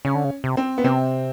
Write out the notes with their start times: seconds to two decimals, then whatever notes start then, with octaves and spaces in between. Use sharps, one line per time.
0.05 C#3 C#4
0.15 D3
0.25 C#3
0.44 C3
0.57 C4
0.78 B3
0.84 C3 C4